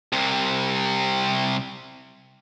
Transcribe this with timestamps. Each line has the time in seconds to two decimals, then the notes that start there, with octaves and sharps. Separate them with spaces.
0.13 C2 C3